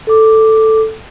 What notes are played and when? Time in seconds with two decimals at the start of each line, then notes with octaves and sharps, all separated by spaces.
0.07 A4 D6